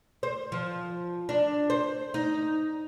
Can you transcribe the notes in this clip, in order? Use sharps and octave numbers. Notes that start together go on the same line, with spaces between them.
C5
F3
D4
C5
D#4